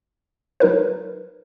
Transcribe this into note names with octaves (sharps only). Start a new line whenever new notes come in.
F#3 D#4 A#4 B4